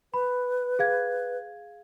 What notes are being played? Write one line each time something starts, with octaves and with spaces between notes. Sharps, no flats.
B4 B5
G#4 F5 G#6